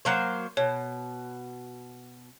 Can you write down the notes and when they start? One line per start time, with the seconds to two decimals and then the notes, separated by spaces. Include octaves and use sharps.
0.05 F#3 A#3 C5
0.57 B2 C#5